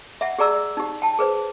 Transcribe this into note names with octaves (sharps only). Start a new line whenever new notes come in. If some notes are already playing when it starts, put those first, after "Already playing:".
E5 F#5
G4 G#4 D5 A#5 E6
D#4 G4
G5 A5
G#4 B4 C5